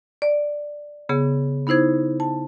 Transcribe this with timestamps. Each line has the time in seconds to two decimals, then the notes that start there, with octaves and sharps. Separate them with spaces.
0.22 D5
1.09 C#3 B3 G#4
1.67 B3 D#4 E4 C5 G#6
2.20 A5